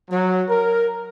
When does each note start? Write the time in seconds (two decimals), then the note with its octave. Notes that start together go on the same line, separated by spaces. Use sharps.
0.11 F#3
0.49 A#4